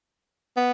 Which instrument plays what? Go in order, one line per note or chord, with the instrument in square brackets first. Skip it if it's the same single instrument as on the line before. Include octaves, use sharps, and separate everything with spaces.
[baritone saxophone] B3